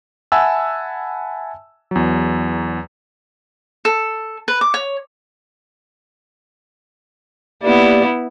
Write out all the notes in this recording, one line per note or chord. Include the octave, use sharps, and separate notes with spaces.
E5 F#5 G#5 A5 B5 E6
E2 F#3
A4
B4
D6
C#5
A#3 B3 E4 G4 D5